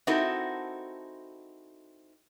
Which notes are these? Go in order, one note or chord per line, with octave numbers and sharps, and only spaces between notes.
C4 D#4 E4 F#4 A4 A#4